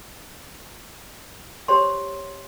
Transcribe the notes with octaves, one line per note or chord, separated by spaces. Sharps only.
G4 C5 C#5 C6